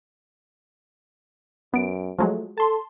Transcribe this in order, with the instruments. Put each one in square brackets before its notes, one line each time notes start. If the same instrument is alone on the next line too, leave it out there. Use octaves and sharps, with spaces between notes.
[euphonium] F#2 [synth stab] B3 D7
[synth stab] F3 F#3 G#3 [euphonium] A3
[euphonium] A4 [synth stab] A5 C6